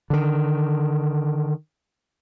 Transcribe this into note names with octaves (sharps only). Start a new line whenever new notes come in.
D3 D#3